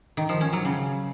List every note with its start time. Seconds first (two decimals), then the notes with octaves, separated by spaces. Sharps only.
0.17 D#3
0.29 F3
0.41 C#4
0.53 F#3
0.65 C#3